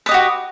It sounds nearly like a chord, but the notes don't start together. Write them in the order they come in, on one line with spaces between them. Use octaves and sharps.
B4 D#5 G4 F#4